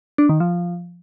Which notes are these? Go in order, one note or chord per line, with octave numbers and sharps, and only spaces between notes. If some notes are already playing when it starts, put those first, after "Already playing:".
D4
D#3
F3